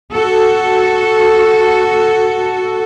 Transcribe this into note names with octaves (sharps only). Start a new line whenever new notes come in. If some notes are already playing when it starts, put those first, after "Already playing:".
F#4 A4